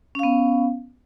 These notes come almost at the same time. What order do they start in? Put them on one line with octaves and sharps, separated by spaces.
C#4 F5 B3